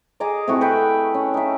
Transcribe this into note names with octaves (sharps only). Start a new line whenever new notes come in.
G#4 D#5 A#5 D6
C3 A3 E4 F#4
B4 E5 F#5 G5
C#4
D#4 E5